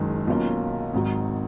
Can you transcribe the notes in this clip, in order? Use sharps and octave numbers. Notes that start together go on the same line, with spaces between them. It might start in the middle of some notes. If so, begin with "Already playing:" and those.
Already playing: F#1 F#2 D#3 G#3
B1 B2 A#3 C#4 F4
G#1 G#2 D#3 F#3